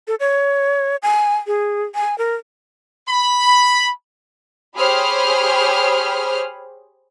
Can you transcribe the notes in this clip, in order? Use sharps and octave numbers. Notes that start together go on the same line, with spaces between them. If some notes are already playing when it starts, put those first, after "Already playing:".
A4
C#5
G#5
G#4
G#5
A#4
B5
G4 G#4 C5 C#5 B5 F6